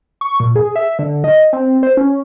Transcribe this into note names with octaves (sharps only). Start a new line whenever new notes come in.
C#6
A#2
G#4
E5
D3
D#5
C4
C5
C#4